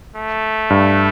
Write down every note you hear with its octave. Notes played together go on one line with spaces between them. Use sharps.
A3
G2